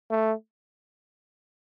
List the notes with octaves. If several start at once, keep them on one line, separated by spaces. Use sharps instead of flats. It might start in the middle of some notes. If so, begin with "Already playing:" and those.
A3